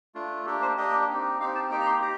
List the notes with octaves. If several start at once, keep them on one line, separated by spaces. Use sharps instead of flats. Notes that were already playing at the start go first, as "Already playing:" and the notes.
A3 D4 F4
A#3 D4 G4 A4
C5
A#3 D4 G4 D#5
C4 D#4 G4
C4 D#4 G4 F5
A5
A#3 D#4 G4 G5
A#5
C6
G4 A#5